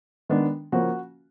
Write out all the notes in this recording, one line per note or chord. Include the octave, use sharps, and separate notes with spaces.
D#3 G#3 B3 D4
C#3 F3 A#3 C#4 F#4